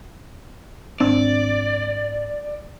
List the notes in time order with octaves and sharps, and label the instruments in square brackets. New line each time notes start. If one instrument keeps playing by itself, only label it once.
[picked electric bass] G#1 C4 D4 [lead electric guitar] D5